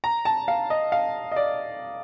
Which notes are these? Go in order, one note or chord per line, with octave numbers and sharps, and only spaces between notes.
A#5
A5
F5
D#5
F5
D#5
D5